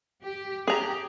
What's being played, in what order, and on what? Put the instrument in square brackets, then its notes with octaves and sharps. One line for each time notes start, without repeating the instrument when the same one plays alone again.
[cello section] G4
[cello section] G4 [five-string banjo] G#4 A#5